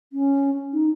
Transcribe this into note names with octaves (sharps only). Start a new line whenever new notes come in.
C#4
D#4